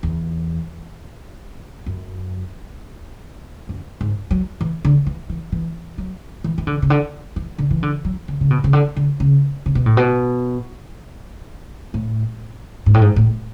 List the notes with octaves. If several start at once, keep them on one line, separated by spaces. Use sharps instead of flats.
E2
F#2
F#2
G#2
F#3
E3
D3
E3
E3
E3
F#3
E3
E3
D3
C#3
D3
E3
D3
E3
D3
F#3
D3
C#3
B2
C#3
D3
D3
C#3
C#3
B2
A2
B2
A2
G#2
A2
G#2
A2